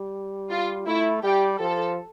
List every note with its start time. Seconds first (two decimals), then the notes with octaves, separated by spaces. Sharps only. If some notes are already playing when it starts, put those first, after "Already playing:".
Already playing: G3
0.50 F4
0.87 A3 E4
1.23 G3 G4
1.59 F3 A4